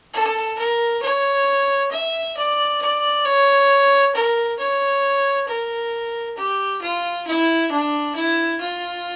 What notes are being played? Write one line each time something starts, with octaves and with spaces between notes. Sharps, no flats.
A4
A#4
C#5
E5
D5
D5
C#5
A#4
C#5
A#4
G4
F4
E4
D4
E4
F4